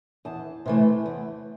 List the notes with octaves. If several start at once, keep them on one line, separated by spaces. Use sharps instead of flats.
E2 A5
C3 E3 A3
E2